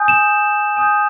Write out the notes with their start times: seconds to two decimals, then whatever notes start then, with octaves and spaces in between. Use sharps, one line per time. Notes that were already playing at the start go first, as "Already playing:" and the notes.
Already playing: G#5 D#6 G6
0.08 E7
0.77 G#5 D#6 G6